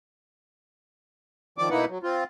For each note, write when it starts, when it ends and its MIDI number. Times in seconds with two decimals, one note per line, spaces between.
1.58 1.69 51
1.58 1.69 53
1.58 1.69 74
1.58 1.69 86
1.70 1.85 47
1.70 1.85 58
1.70 1.85 63
1.70 1.85 64
1.70 1.85 71
1.70 1.85 78
1.89 1.98 54
2.03 2.24 60
2.03 2.24 65